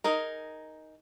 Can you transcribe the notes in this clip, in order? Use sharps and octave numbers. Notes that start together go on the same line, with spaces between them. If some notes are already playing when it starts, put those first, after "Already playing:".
D#4 G#4 A#4